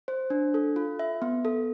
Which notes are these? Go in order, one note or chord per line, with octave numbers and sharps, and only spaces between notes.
C5
D4
A4
F4
E5
B3
A4